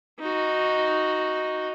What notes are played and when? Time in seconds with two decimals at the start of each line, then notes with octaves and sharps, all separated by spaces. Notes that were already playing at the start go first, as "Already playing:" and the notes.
0.19 D#4 F#4